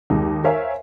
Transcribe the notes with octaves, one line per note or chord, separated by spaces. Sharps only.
D#2 G#3 D#4
A#4 C5 C#5 E5 F5 G#5